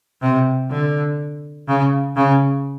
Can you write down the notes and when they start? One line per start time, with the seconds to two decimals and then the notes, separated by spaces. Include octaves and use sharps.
0.21 C3
0.70 D3
1.68 C#3
2.16 C#3